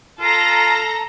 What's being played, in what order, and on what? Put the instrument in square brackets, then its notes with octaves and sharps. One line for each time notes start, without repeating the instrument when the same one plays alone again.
[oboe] F4 [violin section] A4 A#5 A#6